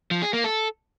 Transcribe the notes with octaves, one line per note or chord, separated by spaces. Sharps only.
F3
G#4
A#3
A4